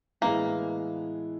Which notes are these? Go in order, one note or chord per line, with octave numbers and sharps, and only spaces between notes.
A2 E3 G#3 A#3 B3 E4